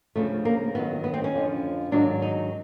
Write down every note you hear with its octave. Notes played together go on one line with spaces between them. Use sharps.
D2 C#3 F3 A3
A#3
G2 D#3 F#3 B3
B3
C4
C#4
F2 D3 F3
G#2 D#3 F#3 D4
D#4